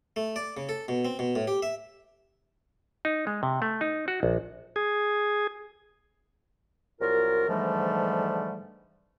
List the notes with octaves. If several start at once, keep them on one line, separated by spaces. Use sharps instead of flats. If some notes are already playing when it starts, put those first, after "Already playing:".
A3
D5
C#3
A4
B2
C4
B2
A2
G4
E5
D#4
G#3
C3
A3
D#4
F#4
A#1
G#4
C2 F#3 F4 A#4
G#2 D3 E3 F3 G3 A3